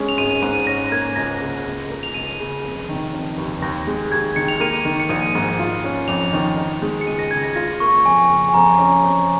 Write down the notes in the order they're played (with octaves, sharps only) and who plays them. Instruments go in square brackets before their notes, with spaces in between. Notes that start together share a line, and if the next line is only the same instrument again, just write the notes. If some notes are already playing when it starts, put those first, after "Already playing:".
Already playing: [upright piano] G#3 C#4
[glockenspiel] F7
[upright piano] G#1 [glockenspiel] D#7
[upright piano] G#2 [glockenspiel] D#7
[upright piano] C#4 [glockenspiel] A#6
[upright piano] A#3 [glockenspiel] G#6
[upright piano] C#2 [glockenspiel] A#6
[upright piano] C#3
C#2
A#3
[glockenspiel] F7
[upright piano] C#2 [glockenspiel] D#7
[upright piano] C#3
F1
D#3
F1
D#2
[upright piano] D#2 [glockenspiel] A#6
[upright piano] G#3
[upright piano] D#2 [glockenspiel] G#6
[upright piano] D#3 [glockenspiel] C#7
[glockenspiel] F7
[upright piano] A#3 [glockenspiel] D#7
[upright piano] D#3
[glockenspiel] C#7
[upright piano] A#1 [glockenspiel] D#7
[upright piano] G#2
F4
C#4
[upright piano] F2 [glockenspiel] F7
[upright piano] D#3
D#4
G#3
[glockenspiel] C#7
[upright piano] C#2 [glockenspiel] D#7
[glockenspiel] A#6
[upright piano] C#3 [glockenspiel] G#6
[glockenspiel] A#6
[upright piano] F4 [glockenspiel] A#6
[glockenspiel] A#6
[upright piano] A#3 [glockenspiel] C#6
[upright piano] F2 [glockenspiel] G#5
[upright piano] C#3
[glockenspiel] G#5
[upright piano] F2 [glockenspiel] A#5
[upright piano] C#4
F2